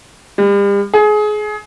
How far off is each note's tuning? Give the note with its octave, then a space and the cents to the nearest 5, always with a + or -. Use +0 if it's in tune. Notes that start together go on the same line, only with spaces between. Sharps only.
G3 +40
G#4 +25